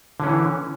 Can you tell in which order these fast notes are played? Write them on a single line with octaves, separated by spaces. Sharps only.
D3 C#4 E3